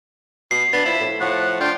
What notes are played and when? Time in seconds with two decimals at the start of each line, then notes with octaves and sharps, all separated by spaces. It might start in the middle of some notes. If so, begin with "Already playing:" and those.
0.51 B2 C7
0.73 B3 D4 A6
0.85 F3 E4
1.00 A2
1.21 A2 F3 F#5
1.60 D4 F4 G5